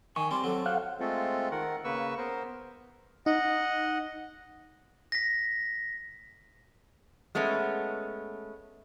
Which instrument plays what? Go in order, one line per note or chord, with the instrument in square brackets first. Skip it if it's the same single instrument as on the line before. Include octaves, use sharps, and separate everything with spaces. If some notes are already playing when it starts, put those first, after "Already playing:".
[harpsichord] D#3 [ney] G#5 [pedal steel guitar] C#6
[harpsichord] G3 [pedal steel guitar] C4 [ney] C6
[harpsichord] F#3 [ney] A4
[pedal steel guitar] F#4 C5 C#5 [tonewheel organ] F5 F#5
[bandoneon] G#3 A3 C4 F4 A4
D#3 A#4 F#5
C#3 A#3 B4 C#6 E6
B3 A#4 C5
[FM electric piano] D#4 [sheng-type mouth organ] D#5 F#5
[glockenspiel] A#6 B6
[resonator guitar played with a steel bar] G#3 A3 B3 C#4